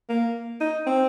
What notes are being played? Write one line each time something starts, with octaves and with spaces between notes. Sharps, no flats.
A#3
D#4
C4